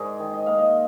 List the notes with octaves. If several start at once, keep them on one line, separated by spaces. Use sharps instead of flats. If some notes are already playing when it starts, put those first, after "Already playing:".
Already playing: G#2 G#4 A#4 C5 D5
D#3
D#5
A#3 F5
D#5